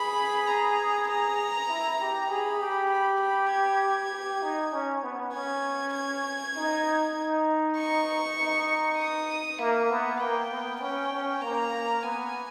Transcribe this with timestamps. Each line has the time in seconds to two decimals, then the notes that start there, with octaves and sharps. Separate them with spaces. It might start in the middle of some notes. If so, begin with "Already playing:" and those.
Already playing: G#4 B5
0.48 A#5
1.08 A#5
1.69 E4
2.00 G4
2.29 G#4 B5
2.60 G4
2.91 B5
3.21 B5
3.52 G#6
4.13 G4
4.42 D#4
4.73 C#4
5.03 B3
5.34 C#4 G#6
5.95 G#6
6.56 D#4
7.17 D#4
7.77 C#6
8.38 D#4
8.98 D#6
9.59 A#3 E5
9.90 B3
10.20 A#3 G5
10.51 B3
10.81 C#4 G5
11.12 C#4
11.42 A#3 A#5
12.03 B3 G#5